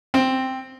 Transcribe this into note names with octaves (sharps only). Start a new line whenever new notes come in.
C4